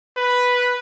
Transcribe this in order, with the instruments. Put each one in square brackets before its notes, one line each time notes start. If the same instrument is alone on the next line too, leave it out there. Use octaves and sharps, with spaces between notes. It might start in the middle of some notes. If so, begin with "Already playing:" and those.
[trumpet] B4